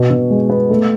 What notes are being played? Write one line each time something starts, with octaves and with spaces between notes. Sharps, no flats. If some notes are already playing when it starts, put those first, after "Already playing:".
Already playing: B2
B2
G#3
B3
A3